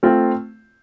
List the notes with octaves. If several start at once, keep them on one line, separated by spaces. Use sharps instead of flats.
A3 C4 F4